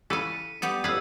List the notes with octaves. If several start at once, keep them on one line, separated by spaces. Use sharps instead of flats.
C#3 E3 A4 F5 F#5 B6 C#7 D#7
G3 B3 G4 A4 D#6 G6
A1 F4 B4 F5 E6 G#6